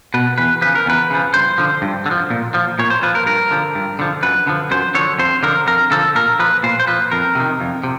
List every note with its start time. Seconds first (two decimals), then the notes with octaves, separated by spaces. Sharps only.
0.14 B2 B4
0.38 E2 B4
0.62 C#3 F3 B4
0.75 A#4
0.86 E2 B4
1.10 C#3 F3
1.34 G2 C5
1.58 D3 F3
1.82 G2
2.06 D3
2.11 F3
2.30 A#2
2.54 F3
2.79 A#2 C#5
2.90 C5
3.03 F3 B4
3.15 A#4
3.26 G2 A#4
3.51 D3 F3
3.75 G2
3.99 D3 F3
4.23 F#2 B4
4.47 D3 F3
4.71 F#2 C5
4.95 D3 F3 C#5
5.19 F2 C5
5.43 D3 F3 A#4
5.67 F2 A#4
5.91 D3 F3 A4
6.15 A#2 A#4
6.39 F3 B4
6.63 A#2 C5
6.80 C5
6.87 F3 B4
7.12 F2 A#4
7.35 C3 D#3
7.60 F2
7.84 C3